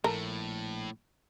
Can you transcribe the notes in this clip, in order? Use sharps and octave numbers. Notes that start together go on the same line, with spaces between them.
A#1 A2 A4 A#4 A#5